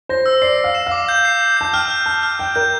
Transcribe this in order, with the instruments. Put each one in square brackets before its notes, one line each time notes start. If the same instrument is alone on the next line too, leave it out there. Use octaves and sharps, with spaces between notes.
[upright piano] C5 [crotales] A#6
[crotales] E6
[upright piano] D5 [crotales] C7
[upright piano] F5 [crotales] C7
[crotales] E7
[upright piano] F5 [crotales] D6
[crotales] G6
C7
C7
[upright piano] A5 [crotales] G6
[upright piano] G5 [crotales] F6
[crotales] F6
[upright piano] A5 [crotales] F6
[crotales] F6
[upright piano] G5 [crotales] G6
[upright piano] A#4 [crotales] G6